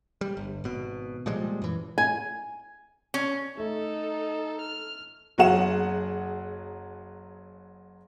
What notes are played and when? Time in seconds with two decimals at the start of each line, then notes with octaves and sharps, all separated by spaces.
0.21 G3
0.37 G1
0.64 G#1 B2
1.26 A#2 F3 G3 G#3
1.62 F#2 E3
1.98 G#5
3.14 C#4
3.58 A3 D#4 A4
4.61 F6
5.38 F#1 F#3 G#4 F#5 E7